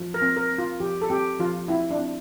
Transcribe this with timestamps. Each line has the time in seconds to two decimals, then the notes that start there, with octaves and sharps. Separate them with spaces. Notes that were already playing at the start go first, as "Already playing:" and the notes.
Already playing: F3
0.14 A#4
0.22 C4
0.36 A#4
0.51 C4
0.58 F4
0.80 F3 G4
1.02 A4
1.10 C4 G4
1.40 F3 F4
1.68 C4 E4
1.91 D4
1.99 C4